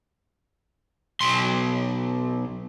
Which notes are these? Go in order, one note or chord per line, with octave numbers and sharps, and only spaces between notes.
B1 C6